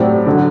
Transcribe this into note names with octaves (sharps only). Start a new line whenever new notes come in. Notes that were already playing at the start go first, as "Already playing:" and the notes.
Already playing: A2 F#3 C4 G4 D5
D3 F#3